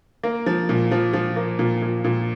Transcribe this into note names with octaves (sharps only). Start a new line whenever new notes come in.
A#3
F3
A#2
F3
F3
A#3
A#2
A#2
A#2